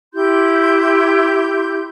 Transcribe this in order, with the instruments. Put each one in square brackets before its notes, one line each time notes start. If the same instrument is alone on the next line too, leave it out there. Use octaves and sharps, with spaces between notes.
[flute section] E4 G4 C6 G6